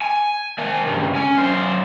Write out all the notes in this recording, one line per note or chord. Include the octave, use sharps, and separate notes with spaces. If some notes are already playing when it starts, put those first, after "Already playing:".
G#5
D#3 G#5
C#2 G2
C#4 G#5
F#2 C5